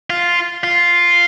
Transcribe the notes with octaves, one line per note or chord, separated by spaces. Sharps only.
F4
F4